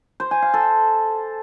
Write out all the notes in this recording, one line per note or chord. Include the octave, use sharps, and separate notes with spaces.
C5
G#5
F5
A4